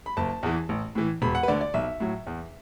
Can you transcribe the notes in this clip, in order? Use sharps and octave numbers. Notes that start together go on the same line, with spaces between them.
B5
F#1 A5
E2 E3
A1
A2 E3
E1 B5
F#5
B4
D2 D3 D5
D5
B1 E5
A2 F#3
E2